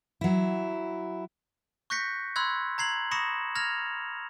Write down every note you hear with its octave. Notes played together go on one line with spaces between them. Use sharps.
F#3 E4
C#6 F#6 G6 A#6 B6 C#7
B5 C6 E6 F#6 G#6
A#5 G#6 C7 F#7
B5 C#6 D#6 A#6 C#7 E7
F6 G#6 A#6 F7